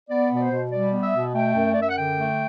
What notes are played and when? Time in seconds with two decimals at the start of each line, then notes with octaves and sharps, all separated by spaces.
0.09 B3 D5
0.31 B2
0.36 D5
0.41 C5
0.51 B2
0.72 G3 D5
0.93 B3
1.03 E5
1.13 B2
1.34 A3 G5
1.55 F#2
1.74 F#2 D5
1.82 E5
1.89 F#5
1.97 D3 G5
2.18 A3